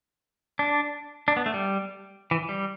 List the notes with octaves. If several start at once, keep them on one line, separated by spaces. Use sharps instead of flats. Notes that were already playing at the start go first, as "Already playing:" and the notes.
D4
D4
B3
A3
G3
E3
G3